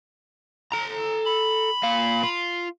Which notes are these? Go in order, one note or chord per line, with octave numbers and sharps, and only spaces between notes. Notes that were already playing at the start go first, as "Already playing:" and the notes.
A4 A#5
B5
A#2 F5
F4